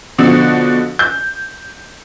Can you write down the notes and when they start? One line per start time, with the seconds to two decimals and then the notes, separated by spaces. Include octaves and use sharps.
0.18 B2 D3 F3 F#4
0.99 G6